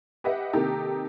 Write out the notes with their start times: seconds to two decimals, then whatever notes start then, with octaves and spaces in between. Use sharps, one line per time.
0.24 G4 B4 D#5 E5 F#5
0.53 C3 D#3 A#3 D#4 G4 A4